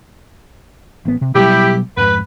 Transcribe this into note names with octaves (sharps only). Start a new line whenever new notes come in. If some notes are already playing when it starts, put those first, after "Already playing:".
A1 B3
C3
B2 F#3 G3 E4 G4
F2 G#2 B4